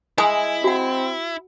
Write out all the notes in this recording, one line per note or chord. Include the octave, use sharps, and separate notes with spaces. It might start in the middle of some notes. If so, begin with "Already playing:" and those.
G#3 E4 G#5 D#6
C4 F#4 F#5